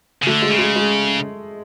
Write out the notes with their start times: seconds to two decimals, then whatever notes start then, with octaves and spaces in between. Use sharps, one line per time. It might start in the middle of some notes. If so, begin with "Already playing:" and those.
0.22 C#3
0.27 D3 A3
0.42 G#3
0.51 C#3
0.59 G#3
0.76 G#3